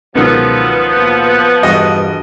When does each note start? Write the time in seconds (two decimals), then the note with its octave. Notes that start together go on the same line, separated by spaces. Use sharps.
0.15 C#2 B2 D#3 F3 F#3 B3
0.98 A#2
1.63 E1 G2 F#4 D#5